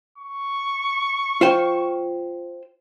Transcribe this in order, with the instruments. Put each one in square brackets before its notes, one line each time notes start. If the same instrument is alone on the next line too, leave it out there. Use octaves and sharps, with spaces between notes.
[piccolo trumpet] C#6
[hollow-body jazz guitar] F4 C5 G5